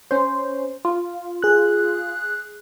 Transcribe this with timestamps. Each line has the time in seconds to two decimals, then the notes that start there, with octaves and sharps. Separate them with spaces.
0.11 C#4 C5
0.85 F4
1.42 G#4 F#6